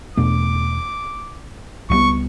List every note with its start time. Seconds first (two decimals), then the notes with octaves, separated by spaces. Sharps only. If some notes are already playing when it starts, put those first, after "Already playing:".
0.17 E2 B2 A3 D4 D6
1.90 C#2 C#3 G3 B3 C#6